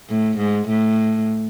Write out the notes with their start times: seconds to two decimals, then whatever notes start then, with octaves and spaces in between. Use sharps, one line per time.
0.09 A2
0.39 G#2
0.69 A2